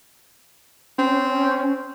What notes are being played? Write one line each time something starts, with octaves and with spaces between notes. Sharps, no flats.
C4 C#4